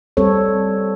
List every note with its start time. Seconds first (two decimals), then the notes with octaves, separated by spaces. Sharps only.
0.17 G3 C4 A4 C#5